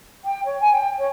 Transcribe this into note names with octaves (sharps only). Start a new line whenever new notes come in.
G5
C#5
G#5
G5
C#5